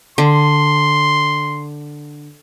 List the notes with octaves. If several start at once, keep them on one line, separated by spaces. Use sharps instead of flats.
D3 C6